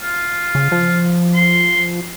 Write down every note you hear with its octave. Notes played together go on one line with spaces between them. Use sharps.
F4
C#3
F3
C6